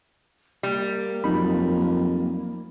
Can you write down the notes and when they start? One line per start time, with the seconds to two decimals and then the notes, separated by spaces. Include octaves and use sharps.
0.63 G3 A#3
1.24 F2 F#3 D#4 B5